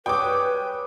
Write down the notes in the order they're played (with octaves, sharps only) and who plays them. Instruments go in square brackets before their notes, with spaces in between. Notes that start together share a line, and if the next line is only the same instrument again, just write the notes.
[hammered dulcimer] G3 G#4 C#5 [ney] B4 [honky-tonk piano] G5 D6